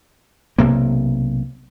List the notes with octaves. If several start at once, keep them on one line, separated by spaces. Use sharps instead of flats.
B1 C3 A#3